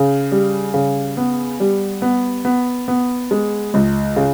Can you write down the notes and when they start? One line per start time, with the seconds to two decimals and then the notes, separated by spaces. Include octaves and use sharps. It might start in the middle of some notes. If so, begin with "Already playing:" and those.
Already playing: C#3
0.32 G3
0.74 C#3
1.17 B3
1.60 G3
2.02 B3
2.45 B3
2.88 B3
3.31 G#3
3.74 C#2
4.16 C#3